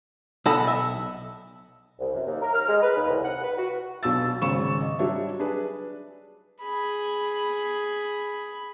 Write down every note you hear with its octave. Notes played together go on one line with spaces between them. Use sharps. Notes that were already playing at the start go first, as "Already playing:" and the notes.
B1 A4 D#5 F#5 B5
E5
C2
F#2
D#2
A#4
F6
G#3
B4
D#2
C2
F#5
B4
F#4
B1 B2 D4 F5 E6 A6
G#1 C#3 C#4 C#6 E7
D#5
F#3 G3 D4 G4 C#5 E5
D4 G#4 B4
G#4 B5